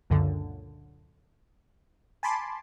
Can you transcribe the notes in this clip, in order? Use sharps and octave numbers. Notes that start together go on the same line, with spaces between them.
C#2 F#2 A#2 D3
G#5 A5 B5 C6 D6